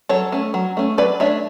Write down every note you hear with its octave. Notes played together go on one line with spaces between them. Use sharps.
F#3 A4 C#5
A3 C#4
F#3
A3 C#4
F#3 B4 D5
A3 D4 C#5 E5